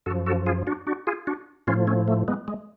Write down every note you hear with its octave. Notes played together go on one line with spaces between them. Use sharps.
F#2 F3 F#4 A4
F#4 A4
F4 G#4
D4 F#4
D4 F#4
F4 G#4
D4 F#4
A2 F3 C#4 F4
A3 C#4
A3
G#3 B3
G#3